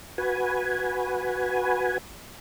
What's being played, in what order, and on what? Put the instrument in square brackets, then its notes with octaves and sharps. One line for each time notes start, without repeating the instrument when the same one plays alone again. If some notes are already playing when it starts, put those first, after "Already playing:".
[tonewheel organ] F#4 B4 G#5